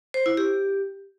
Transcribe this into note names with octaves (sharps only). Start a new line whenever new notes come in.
C5
E4
G4